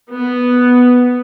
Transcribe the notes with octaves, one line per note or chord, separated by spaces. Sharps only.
B3